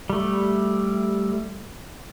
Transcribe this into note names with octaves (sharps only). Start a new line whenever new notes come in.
G3 A3